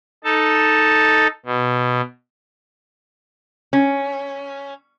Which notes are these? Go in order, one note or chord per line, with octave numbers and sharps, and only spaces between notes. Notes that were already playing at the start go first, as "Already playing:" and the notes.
D#4 A4 A5
B2
C#4